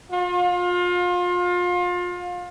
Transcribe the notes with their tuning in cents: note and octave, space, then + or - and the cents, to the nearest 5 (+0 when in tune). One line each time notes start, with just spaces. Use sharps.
F4 +30